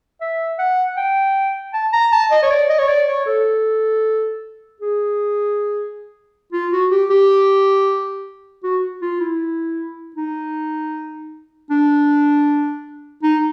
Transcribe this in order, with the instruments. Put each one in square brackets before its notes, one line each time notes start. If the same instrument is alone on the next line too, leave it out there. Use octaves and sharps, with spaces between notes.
[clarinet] E5
F#5
G5
A5
A#5
A5
D#5
C#5
D5
D#5
C#5
D5
C#5
A4
G#4
F4
F#4
G4
G4
F#4
F4
E4
D#4
D4
D#4